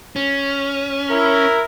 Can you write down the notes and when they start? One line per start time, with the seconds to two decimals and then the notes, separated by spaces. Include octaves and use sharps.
0.16 C#4
1.11 E4 A#4